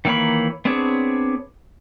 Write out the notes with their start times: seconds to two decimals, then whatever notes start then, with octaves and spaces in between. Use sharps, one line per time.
0.05 D#3 E3 A#3 C#5 B5
0.65 B3 C4 D4 G#4 C#5